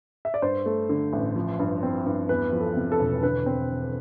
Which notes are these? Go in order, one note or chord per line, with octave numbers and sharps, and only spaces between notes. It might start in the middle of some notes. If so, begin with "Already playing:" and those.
E5
D5
G2 C5
A3
D3
A1
F3
G2
C4
G2
E2 B4
F3
A4
C3
A4
E1
D3 B4
C4